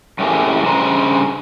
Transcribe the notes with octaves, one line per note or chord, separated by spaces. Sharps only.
F#2 A2 A#3 G4 G#4
G2 C#3 C5 A#5